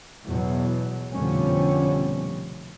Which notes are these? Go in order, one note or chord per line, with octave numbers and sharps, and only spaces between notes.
E2 B2 F#3
F1 B2 D3 F3 G3 C#4